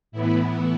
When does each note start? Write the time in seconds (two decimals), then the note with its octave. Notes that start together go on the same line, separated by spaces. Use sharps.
0.12 A2 E3 B3 E4
0.41 E4